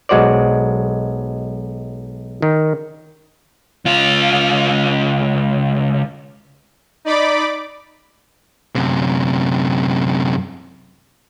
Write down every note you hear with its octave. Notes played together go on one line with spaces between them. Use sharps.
B1 G#3 F#4 C5 D5
D#3
C#2 F4
D#4 D5 B5 D6
F#2 C3